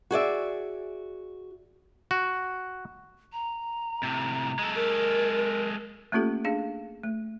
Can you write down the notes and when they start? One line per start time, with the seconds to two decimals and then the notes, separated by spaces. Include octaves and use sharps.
0.11 F#4 G#4 D5 E5
2.11 F#4
3.33 A#5
4.03 A2 C3
4.59 G#3 A4
4.75 A#4
6.12 A3 A#3 C#4 F4 G4 A4
6.45 D4 G#4 F5
7.03 A3